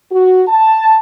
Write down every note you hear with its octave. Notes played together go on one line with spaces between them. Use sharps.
F#4
A5